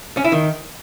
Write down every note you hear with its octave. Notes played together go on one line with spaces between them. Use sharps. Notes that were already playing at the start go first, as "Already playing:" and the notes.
C#4
E4
D#3